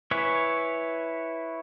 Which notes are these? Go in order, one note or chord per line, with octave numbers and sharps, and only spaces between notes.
E4 B4 C#5 G#5